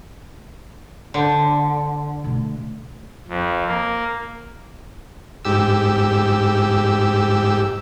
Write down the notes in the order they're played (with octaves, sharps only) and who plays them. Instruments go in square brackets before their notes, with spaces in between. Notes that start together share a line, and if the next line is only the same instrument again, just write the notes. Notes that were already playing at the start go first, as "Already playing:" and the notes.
[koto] D3 [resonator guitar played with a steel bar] C5 A5
[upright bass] B2 A3
[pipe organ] F2
A#3
[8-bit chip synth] G#2 G4 E6